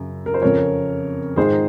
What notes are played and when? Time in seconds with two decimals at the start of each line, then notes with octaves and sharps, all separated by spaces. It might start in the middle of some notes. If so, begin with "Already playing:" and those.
Already playing: F#2 C#3
0.26 A#4
0.34 C5
0.42 F2 C#3 A#4 C#5
1.36 G#2 D#3 G#4 C5